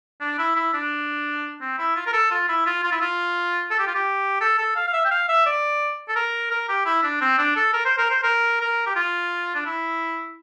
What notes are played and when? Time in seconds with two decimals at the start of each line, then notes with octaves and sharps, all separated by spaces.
0.21 D4
0.39 E4
0.56 E4
0.74 D4
1.61 C4
1.78 E4
1.96 F4
2.07 A#4
2.13 A4
2.31 F4
2.49 E4
2.66 F4
2.83 F4
2.92 E4
3.01 F4
3.71 A4
3.79 G4
3.87 F4
3.95 G4
4.41 A4
4.59 A4
4.76 F5
4.87 F5
4.93 E5
5.05 G5
5.11 F5
5.29 E5
5.46 D5
6.09 A4
6.16 A#4
6.51 A#4
6.69 G4
6.86 E4
7.03 D4
7.21 C4
7.38 D4
7.56 A4
7.73 A#4
7.85 C5
7.98 A#4
8.10 C5
8.23 A#4
8.61 A#4
8.87 G4
8.96 F4
9.55 D4
9.66 E4